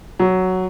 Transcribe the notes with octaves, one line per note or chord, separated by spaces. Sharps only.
F#3